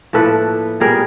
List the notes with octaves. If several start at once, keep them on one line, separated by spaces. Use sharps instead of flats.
A2 F3 A#3 A4 B4
A#2 G3 B3 G#4 A#4